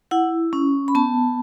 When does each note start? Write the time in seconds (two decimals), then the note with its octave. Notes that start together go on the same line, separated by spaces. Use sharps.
0.11 E4 F#5
0.53 C#4
0.88 B5
0.95 B3 A5